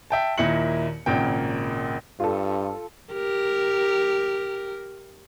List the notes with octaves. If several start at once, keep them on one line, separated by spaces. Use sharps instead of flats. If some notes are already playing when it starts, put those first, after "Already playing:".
E5 G5 A5
D#2 A#2 E4 C#7 F#7
G#1 A#2 C#3 G5
G2 F4 A4
G4 A#4